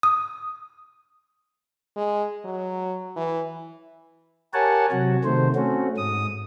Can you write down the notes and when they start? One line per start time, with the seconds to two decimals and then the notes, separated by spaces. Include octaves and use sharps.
0.03 D#6
1.96 G#3
2.45 F#3
3.16 E3
4.54 G4 A#4 C#5 F#5 G#5 A5
4.92 C3 F#3 F#4
5.24 C3 D#3 A3 C5
5.55 A3 C4 C#4 F#4
5.98 G#2 D#6